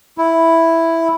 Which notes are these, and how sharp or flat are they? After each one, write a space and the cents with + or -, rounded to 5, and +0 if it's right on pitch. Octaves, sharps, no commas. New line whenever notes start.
E4 +0